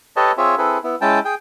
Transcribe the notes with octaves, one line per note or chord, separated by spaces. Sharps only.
G4 A4 B4 C#5 D#5 A5
C4 F4 G#4 C#5 E5
C4 E4 G#4 A4 B4
B3 E4
G#3 C#4 E4 G5 A5
G#4 G5